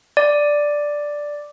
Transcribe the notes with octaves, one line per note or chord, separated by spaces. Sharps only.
D5